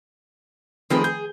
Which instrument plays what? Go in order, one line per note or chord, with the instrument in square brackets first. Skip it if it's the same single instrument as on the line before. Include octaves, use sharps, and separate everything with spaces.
[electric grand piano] D#3 F3 A3 [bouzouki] C4 G#4 B4
[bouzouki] G#4 [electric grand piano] G6